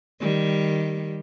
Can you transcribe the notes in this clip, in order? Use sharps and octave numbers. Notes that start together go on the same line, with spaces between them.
D#3 G3